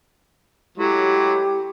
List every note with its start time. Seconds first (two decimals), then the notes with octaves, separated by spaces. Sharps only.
0.78 A2 F#3 G#3 E4 G4